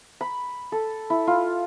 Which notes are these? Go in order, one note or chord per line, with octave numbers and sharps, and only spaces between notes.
B5
A4
E4
F4